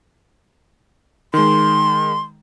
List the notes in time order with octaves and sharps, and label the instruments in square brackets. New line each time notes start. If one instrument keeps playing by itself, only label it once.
[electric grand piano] D#3 G#3 [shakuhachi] C6